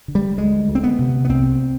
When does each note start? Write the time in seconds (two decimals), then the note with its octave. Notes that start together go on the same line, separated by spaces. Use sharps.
0.08 D3
0.15 G3
0.38 D2 G#3
0.68 D2
0.75 C4
0.83 B3
0.99 C3
1.25 B3
1.29 C2 C4